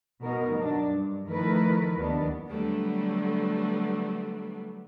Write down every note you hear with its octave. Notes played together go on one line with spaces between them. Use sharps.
B2 D#4 A#4
F#3 D4
G2
D#3 F3 A3 E4 A#4 B4
D#2 D#3 F#3 B3 D4
D3 F#3 G3 A3 B3 D4